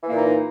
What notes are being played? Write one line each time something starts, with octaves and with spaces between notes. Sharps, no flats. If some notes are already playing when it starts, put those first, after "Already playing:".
A#2 E3 A#3 D#4